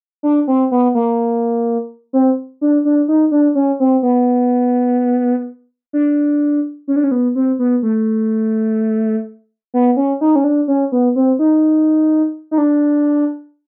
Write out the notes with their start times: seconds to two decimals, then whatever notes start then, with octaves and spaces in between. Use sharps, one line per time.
0.23 D4
0.48 C4
0.71 B3
0.95 A#3
2.13 C4
2.61 D4
2.85 D4
3.08 D#4
3.31 D4
3.55 C#4
3.80 C4
4.03 B3
5.93 D4
6.88 C#4
6.96 D4
7.04 C#4
7.11 B3
7.35 C4
7.59 B3
7.83 A3
9.74 B3
9.97 C#4
10.21 D#4
10.36 C#4
10.44 D4
10.68 C#4
10.92 B3
11.16 C4
11.39 D#4
12.51 D#4
12.58 D4